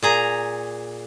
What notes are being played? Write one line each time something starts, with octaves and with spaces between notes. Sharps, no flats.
A#2 G#4 A#5